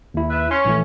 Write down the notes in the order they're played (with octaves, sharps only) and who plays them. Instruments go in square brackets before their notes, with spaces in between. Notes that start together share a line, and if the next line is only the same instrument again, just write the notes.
[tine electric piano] D#2 E4
[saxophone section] B4 E5
[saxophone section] C#4 [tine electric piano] C6
[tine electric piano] A#1 E3 A3